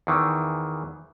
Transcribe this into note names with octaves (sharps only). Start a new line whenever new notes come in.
E2 D#3 E3